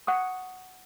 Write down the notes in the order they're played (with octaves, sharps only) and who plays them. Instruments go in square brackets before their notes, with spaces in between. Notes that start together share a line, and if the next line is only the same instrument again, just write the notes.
[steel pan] F#5 C#6 D#6